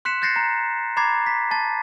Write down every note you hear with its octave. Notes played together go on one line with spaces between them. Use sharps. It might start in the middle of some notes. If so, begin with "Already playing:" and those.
C6 F#6 B6 C#7 E7
F#6 G6 A6 A#6 C7 C#7
A#5
A#5 B5 D6 G#6 A6 C7
B6
A5 A6